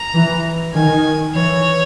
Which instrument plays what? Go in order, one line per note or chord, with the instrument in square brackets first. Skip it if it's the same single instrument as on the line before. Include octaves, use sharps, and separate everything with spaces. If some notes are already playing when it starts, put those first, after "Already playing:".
Already playing: [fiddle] A#5
[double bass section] E3
[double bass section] D#3 [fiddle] G#5
[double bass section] E3 [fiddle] C#5